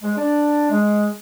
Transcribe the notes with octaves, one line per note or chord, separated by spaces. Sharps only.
G#3
D4
G#3